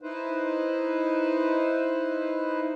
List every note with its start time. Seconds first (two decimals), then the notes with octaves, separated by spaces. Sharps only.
0.02 D#4 E4 B4 C5